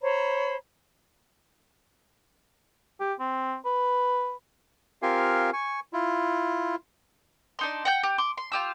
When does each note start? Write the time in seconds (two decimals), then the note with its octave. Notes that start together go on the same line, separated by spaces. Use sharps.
0.01 C5 C#5 A#5 B5
3.00 G4
3.20 C4
3.65 B4
5.02 C4 F4 G4 A#4 F5 G#5
5.53 G#5 C#6
5.93 E4 F4
7.59 D4 D#4 C6
7.85 F#5 G5 G6
8.03 G4
8.18 C6 D6
8.38 C6
8.52 F4 G4 E6